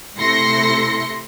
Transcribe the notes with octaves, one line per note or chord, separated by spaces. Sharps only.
C3 A3 E4 C6 A#6 C#7